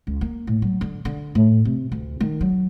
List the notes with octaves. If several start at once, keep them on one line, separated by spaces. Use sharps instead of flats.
C#2
A#3
A2
F#3
D3
D3
A2
C3
D2
D#3
F#3